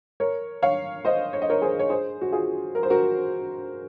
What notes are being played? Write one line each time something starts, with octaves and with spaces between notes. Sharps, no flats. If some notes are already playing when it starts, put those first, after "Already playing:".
A#4 C#5
C#5 F5
C5 D#5
C#5
D#5
A#4 C#5
G#4 C5
C#5
G#4 C5
F#4
F4 G#4
A#4
C5
F#4 A#4